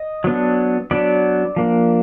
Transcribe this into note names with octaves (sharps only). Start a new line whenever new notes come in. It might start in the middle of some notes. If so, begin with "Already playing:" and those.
Already playing: D#5
F#3 B3 D4
F#3 B3 D4 D5
F3 A#3 D4